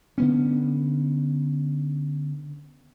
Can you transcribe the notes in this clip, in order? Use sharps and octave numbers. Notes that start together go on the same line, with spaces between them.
D3 B3 C#4